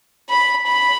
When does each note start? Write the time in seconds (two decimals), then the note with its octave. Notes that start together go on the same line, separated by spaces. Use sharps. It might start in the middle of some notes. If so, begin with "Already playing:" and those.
0.30 B5
0.66 B5